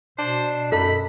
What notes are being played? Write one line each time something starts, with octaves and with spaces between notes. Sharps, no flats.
B2 D4 C5
F#2 D#4 A4 B5